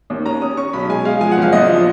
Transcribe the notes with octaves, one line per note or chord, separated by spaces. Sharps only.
D#2
C#4 A#5
C#4 D#6
C#4 C#6
B1 B5
G#3 G#5
G#3 F5
F3 G#5
F#5
F#1 F5
A#1 D#5
F3